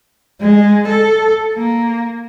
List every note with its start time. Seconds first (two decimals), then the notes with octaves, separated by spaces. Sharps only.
0.41 G#3
0.88 A4
1.55 A#3